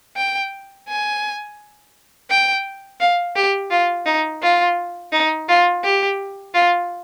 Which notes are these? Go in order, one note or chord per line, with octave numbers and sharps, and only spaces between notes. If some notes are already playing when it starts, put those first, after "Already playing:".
G5
G#5
G5
F5
G4
F4
D#4
F4
D#4
F4
G4
F4